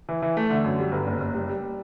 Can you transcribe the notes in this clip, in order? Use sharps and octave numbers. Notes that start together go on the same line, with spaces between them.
E3
E3
A3
D3
F#2
G3
G1
F#1
F#1
G3
G3